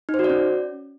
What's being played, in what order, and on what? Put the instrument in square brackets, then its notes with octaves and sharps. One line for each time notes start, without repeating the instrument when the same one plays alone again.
[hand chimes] D#4
C5
F#4
D5
C#4